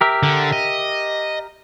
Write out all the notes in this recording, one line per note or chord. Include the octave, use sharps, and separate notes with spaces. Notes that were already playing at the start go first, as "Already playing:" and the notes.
G4 A#4 E5
D3
D#5